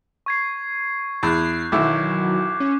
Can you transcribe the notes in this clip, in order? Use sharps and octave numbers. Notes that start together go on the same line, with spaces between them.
C#6 G#6 C7
E2 F#6 G6 C7
B1 D#3 E3 F#3 E4 D6
C#4